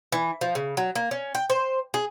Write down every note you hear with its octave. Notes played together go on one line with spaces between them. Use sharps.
E3
F3
C#3
F#3
A#3
C#4
G5
C5
G#4